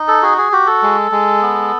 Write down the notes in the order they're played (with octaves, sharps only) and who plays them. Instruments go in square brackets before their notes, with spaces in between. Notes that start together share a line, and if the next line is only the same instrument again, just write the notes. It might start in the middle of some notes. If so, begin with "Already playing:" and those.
Already playing: [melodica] D#4
A4
F#4 G#4
G#4
F#4 G4
A4
G#3
G#3
B3